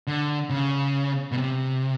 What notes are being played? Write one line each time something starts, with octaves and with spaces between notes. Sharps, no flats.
D3
C#3
B2
C3